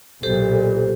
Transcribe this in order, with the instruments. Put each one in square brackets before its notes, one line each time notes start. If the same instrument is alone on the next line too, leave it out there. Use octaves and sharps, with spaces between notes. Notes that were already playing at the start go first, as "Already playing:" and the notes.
[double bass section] B1 A#2 [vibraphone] G4 A4 C5